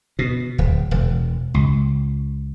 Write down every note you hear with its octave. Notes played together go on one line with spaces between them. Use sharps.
B2
D1
E1
C#2